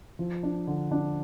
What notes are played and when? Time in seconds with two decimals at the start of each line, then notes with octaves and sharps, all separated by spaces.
0.19 F3
0.43 D4
0.67 D3
0.91 D4